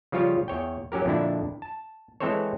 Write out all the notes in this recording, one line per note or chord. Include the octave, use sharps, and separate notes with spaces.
C#3 F3 G3 F4 C#5
E2 C#5 G5
F#3 C#4 G4 A#4
F2 A#2 D3 D4 E4
A5
E3 G#3 C4 A4 C5 C#5